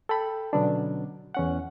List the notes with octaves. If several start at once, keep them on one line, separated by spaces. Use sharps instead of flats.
A4 G5 B5
B2 D3 F#3 B3 C#4 D4
E2 C#4 F#5